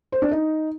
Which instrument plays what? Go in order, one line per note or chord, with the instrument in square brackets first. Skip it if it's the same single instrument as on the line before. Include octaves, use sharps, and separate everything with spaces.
[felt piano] C5
D4
D#4